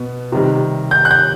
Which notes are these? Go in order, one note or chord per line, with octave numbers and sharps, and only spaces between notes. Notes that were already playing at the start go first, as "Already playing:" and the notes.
Already playing: B2 B3
C3 D#3 G3
G6
F#6
G6